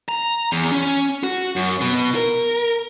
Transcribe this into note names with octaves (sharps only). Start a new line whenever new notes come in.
A#5
E2
C#4
F#4
F#2
B2
A#4